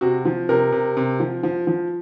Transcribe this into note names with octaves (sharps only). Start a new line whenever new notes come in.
C3 F#4
F3
C3 A#4
C3
C3
F3
F3
F3